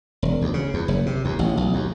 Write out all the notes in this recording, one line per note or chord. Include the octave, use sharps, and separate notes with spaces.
E1
D2
C#3
E2
F#1
C3
D#2
A1
B1
D#2